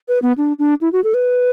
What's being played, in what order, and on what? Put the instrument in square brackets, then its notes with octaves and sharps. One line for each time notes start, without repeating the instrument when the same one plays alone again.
[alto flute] B4
B3
D4
D4
E4
F#4
A4
B4